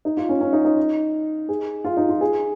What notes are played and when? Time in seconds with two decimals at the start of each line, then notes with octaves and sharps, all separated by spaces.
0.05 D#4
0.17 F4
0.29 C#4
0.41 C#4
0.53 D#4
0.65 D#4
1.49 G#4
1.85 F4
1.97 D#4
2.09 F4
2.21 G#4